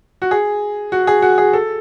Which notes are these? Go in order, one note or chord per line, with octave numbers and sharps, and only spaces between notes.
F#4
G#4
F#4
G#4
F#4
G#4
A4